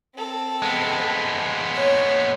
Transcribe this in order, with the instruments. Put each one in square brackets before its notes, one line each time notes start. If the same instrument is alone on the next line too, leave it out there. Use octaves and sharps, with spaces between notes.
[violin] C4 A4
[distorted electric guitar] G#3 B3
[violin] C#5